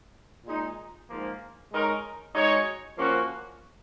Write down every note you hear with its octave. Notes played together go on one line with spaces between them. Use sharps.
A#2 G#3 D#4
G#2 F3 A#3
G#3 D#4 A#4 C#5
G#3 D#4 F#4 C#5
F3 A#3 C#4 F#4